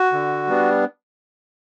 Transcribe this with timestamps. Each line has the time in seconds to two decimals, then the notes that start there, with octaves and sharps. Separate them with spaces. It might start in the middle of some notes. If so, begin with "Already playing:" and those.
Already playing: F#4
0.12 D3
0.48 G3 B3 D4